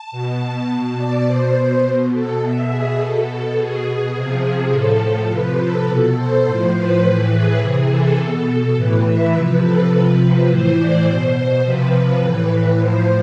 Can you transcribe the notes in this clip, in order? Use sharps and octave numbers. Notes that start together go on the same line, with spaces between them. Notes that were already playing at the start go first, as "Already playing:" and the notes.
Already playing: A5
B2
A5
B2 A5
D5
B2 C5
B2
A4
B2 E5
G#4
B2 A4
A4
B2 G#4
G#4
C3 F3
A2 F3 A4
C3 F3 B4
A4
B2 A4
C5
A2 F3 C5
B4
A2 E3 B4
G#4
C3 E3
A4
B2
A2 E3 B4
E5
C3 F3 B4
A4
C3 F3 B4
A2 E3 C5
D5
B2 C5
C3 F3 B4
B4
A2 E3
A2 F3 C5